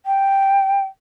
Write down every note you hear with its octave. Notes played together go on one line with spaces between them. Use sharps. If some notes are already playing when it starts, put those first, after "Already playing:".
G5